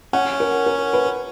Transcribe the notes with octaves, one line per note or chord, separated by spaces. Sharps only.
C#4 F#5
A#4
A#4
B4